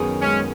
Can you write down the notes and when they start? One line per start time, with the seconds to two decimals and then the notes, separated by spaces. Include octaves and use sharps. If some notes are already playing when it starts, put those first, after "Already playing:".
Already playing: F#2 D#3 B3 G#4
0.21 G#3 C#4